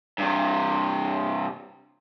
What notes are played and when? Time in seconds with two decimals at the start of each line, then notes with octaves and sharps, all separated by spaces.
0.18 G2 C3